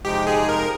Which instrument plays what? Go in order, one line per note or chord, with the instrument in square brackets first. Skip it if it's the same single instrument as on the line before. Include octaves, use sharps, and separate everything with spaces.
[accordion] F2 C3 F3 G#3 D#4 [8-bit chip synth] G4
[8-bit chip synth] G#4
A#4